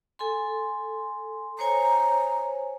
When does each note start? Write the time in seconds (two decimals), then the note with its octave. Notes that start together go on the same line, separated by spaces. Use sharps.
0.19 A4 G#5 C6
1.59 C5 C#5 G#5 A#5